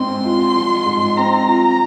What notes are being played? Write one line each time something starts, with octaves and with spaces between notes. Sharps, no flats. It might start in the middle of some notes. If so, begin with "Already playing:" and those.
Already playing: G#2 C4 C6
F4
F3
G#2
C4 A#5
F4